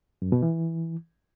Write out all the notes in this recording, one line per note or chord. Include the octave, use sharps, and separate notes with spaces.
F#2
B2
E3